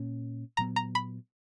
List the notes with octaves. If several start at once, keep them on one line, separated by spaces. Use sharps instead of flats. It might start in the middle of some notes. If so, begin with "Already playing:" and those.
Already playing: A#2 A#3 C#4
A#2 F#3 B3 A#5
A#5
B5